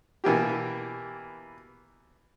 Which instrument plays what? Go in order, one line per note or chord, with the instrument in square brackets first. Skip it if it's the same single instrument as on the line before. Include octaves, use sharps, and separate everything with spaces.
[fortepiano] B2 E3 A#3 G4